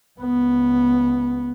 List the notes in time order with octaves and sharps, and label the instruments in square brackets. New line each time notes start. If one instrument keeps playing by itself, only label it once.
[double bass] C#2 B3